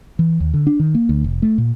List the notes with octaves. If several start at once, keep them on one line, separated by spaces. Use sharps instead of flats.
E3
D#2
D3
D4
D#3
A#3
D2
F1
A3
A#2